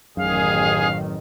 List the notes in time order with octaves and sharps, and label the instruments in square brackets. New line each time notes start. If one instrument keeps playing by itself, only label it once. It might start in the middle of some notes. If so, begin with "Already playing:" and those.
[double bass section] A1 D#3 [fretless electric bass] F#2 [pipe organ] G#4 [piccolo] F5